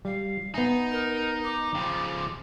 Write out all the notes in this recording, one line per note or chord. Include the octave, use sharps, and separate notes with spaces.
G3 F5
B3 D#4 E5 G#5
A#4
D6
C#3 F3 G5